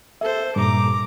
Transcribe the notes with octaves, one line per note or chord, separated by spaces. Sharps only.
A4 C5 E5
G2 A#2 A#5 D6